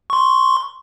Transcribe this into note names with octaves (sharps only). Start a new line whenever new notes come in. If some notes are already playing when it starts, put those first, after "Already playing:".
C6 C#6